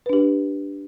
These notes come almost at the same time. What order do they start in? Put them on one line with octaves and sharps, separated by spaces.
B4 D4 G4